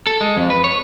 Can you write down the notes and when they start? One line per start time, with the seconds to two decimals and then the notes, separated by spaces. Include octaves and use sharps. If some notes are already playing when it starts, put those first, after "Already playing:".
0.07 A4
0.21 G#3
0.37 F2
0.50 B4
0.64 C#5